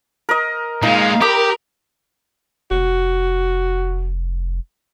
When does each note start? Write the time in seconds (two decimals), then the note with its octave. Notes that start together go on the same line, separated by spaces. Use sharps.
0.29 A#4 D#5
0.83 A#2 G#3 D#4 F5
1.21 G4 A#4 B5 D6 D#6
2.71 F1 F#4